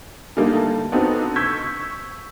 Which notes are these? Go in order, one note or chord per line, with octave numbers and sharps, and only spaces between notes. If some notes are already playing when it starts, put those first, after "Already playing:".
D3 G3 A3 A#3 D#4
A5
B3 C4 D4 D#4 F#4 A4
C#6 E6 G6 G#6 B6